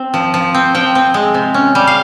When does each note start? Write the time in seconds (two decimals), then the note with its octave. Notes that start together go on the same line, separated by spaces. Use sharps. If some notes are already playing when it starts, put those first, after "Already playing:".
Already playing: C4
0.14 F3
0.34 F3
0.54 C4
0.75 F3 G5
0.95 C4
1.14 G#3
1.34 C3
1.54 C#4
1.75 G3
1.87 F5